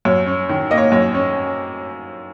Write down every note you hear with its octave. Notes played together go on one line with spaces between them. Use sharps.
F#2 C#5
C#4
D#3
A#3 D#5
C#5
F#2 C#5
C#4